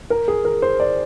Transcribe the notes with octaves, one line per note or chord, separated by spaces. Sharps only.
A#4
G#4
A#4
C5
D5